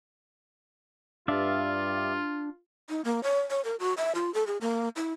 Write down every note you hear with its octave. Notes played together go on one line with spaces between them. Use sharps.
G2 D4 F4 D5 E5 F5
D#4
A#3
C#5
C#5
A#4
F#4
E5
F4
A4
G#4
A#3
E4